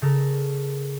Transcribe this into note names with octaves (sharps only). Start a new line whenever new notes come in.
C#3 A4 A#4